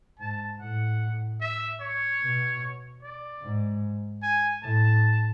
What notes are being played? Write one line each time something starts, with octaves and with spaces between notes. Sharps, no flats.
G#2 A5
A2 F#5
E5
C#5
B2
D5
G#2
G#5
A2 A5